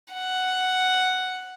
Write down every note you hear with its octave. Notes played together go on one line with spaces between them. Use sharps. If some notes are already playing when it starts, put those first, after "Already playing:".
F#5